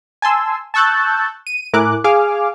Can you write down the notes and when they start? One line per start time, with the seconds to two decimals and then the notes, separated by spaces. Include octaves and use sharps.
0.22 G#5 A5 C6 E6
0.74 A5 C#6 E6 F#6 G6 A6
1.47 D#7
1.73 A2 E4 A#4 G#5 D6 F#6
2.04 G#4 F5 G#5 D6 F6